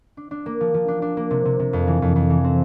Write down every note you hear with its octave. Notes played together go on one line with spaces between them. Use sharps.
D4
D4
A#3
F3
F3
D4
D4
A#3
C3
C3
C3
F2
E3
F2
F2
E3
C4